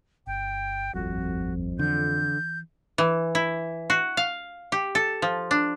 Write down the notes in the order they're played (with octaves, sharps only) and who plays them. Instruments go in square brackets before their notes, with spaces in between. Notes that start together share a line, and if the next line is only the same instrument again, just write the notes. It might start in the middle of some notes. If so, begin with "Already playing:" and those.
[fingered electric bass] G1 [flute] G5
[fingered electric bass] D#1 G#1 G3 [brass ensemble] F2 [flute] F#4
[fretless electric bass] D3 [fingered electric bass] E3 [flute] G6
[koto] E3
E4
F#4
F5
G4
A4
F3
D4